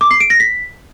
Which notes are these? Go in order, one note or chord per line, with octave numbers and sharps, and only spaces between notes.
D6
C7
D7
A#6
B6